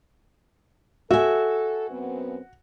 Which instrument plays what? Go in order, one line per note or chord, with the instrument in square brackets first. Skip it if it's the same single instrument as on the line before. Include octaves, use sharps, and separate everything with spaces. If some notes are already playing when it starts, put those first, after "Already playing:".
[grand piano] F#4 [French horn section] A4 [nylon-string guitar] E5 G#5
[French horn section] F#2 B3 C4